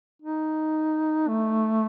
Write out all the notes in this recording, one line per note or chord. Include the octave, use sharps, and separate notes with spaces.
D#4
A3